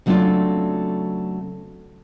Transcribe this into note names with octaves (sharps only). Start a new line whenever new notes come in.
C#3 F#3 A3 C4 D4 F4